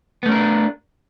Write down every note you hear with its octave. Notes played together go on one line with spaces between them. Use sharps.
A3 B3 C#4 D4 A#4